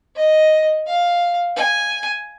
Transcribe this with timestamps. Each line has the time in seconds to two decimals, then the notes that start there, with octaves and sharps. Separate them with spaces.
0.16 D#5
0.87 F5
1.57 G#5